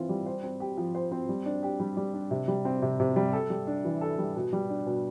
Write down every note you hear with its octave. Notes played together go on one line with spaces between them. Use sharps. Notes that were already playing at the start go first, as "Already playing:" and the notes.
Already playing: E3 C4 F4
G3
C5
C4
G4
F3
C5
C4
G3
D4
G4
G3
G3
D4
C3
G3
C4
C3
C3
G3
A4
G3
D4
E3
A4
G3
B2
G3
D4
B2